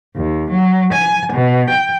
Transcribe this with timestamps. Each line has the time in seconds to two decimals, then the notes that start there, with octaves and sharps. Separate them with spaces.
0.15 D#2
0.50 F#3
0.92 G#5
1.32 B2
1.69 G5